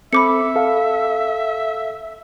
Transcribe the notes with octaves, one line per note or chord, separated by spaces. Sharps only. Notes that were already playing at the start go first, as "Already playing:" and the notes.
C4 A4 E5 B5 D6 C#7
A4 F5